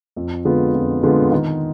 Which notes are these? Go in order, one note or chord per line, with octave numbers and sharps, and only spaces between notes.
F2
D3 G#3 B3 F4
F2
D3 G#3 B3 F4
D#3